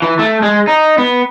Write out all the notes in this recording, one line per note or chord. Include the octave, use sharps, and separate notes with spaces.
E3
A3
G#3
D#4
B3